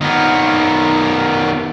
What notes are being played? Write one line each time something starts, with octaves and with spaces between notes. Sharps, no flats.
D#3 B3